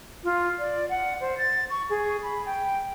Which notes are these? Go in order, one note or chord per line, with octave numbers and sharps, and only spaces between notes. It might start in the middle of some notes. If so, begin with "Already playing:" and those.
F4
D5
F#5
C5
A6
C#6
G#4
B5
G5